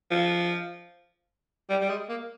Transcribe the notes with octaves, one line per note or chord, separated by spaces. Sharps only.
F3
G3
G3
G#3
A#3